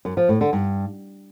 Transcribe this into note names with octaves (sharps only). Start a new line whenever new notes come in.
F#2
F3
A2
D3
G2